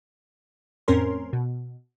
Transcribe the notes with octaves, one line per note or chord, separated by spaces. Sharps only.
F2 A2 C4 C#4 A#4 C6
B2